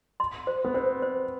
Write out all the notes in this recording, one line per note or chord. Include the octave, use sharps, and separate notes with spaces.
C6
C5
B3
C4 C5
C5